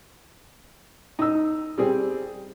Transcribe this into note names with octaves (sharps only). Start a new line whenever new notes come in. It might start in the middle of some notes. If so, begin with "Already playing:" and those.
D#4 E6
G3 C4 G#4